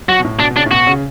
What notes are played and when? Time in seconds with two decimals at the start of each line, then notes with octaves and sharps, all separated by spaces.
0.08 F#3 F#4
0.19 B2
0.25 A2
0.40 B2 D4
0.50 B2
0.56 C#3 D4
0.66 A2
0.71 B2 F#4
0.87 C#3